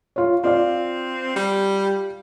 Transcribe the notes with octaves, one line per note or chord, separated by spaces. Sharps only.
F4 C#5
C4 F4 D5 F5
G3